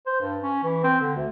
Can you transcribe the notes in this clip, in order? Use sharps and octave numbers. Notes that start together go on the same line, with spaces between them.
C5
G2
C#4
E3
C4
D3
D2